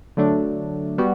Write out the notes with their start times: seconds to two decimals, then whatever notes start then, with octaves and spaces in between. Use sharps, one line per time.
0.17 D3 F#3 A3 D4
0.98 G3 B3 F#4